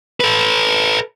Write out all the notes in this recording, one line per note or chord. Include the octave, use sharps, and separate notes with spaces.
A4 B4